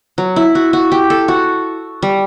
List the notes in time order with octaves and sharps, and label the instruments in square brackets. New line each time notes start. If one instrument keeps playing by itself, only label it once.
[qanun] F#3
E4
F#4
F#4
G4
A4
F#4
G3